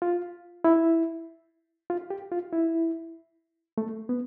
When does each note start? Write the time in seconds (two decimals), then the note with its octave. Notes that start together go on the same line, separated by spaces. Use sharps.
0.02 F4
0.64 E4
1.90 F4
2.10 G4
2.32 F4
2.53 E4
3.78 A3
4.09 B3